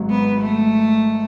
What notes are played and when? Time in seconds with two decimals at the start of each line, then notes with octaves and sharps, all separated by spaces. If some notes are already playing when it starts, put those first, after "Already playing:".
Already playing: G#1 G#2 F#3
0.10 B3
0.42 A3